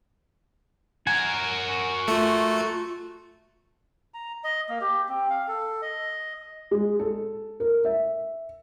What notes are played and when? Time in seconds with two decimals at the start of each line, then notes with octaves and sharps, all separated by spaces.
1.07 F#4 A#4 G#5
2.08 A3 F4
4.14 A#5
4.44 D#5
4.69 A#3
4.81 G4
5.09 C4
5.30 F5
5.48 A4
5.82 D#5
6.71 G#3
7.00 A4
7.60 A#4
7.85 E5